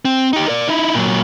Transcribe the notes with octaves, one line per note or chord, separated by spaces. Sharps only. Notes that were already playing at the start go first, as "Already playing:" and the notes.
C4
D#4 G4
A#4 D5
D#4 E4
A#2 F#3